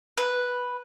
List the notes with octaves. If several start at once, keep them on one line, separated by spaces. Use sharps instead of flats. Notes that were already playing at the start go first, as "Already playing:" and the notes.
B4